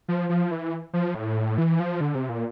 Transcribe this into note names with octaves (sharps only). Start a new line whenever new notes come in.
F3
F3
E3
F3
A2
E3
F3
D3
C3
A#2